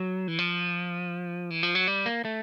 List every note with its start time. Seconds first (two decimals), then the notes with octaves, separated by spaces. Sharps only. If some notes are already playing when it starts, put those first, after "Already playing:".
Already playing: F#3
0.28 E3
0.39 F3
1.50 E3
1.63 F3
1.75 F#3
1.88 G3
2.06 A#3
2.25 A3